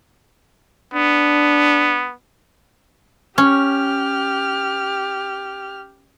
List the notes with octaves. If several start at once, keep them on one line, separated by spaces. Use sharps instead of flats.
B3 D4
C#4 G4 F6